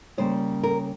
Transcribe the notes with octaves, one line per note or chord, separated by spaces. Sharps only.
C#3 G3 A#3 C#4 C5
A#4